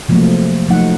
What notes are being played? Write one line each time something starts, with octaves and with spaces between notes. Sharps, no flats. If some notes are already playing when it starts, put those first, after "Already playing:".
C3 F3 F#3 A3 A#3
F3 F#3 A3 D#4 F#5